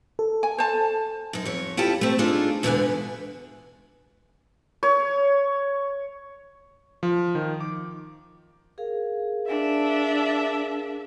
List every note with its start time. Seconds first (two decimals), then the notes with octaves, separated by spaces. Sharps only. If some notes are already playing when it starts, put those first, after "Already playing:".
0.19 A4
0.43 G#5
0.58 C5 A5
1.33 F#2 D#4
1.45 F2 C#5
1.77 E4 F4 G4 A4 A5
2.01 A3 C4
2.18 D4 D#4 F4 G#4 A4
2.63 E2 B2 D3 G#3 B4 G#5
4.83 C#5
7.03 F3
7.35 D#3
7.60 D6
8.78 G#4 A#4 F5
9.47 D4 E5